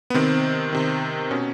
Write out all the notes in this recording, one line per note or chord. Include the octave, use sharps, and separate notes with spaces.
B3
C3 D#3 C4
C3 D#3
B2 C#4